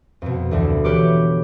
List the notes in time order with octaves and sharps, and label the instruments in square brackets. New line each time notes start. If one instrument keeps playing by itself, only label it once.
[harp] F2 B2
D2 B2 E3
G4 B4 C#5 D6 F6